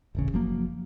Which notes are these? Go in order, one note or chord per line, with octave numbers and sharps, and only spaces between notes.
D#1 A1 C#3
F#1 F3 F#3 A#3